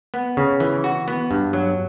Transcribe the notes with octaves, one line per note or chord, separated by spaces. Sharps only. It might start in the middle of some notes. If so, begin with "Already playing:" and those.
B3
C#3
E3
F#4
B3
G2
F#3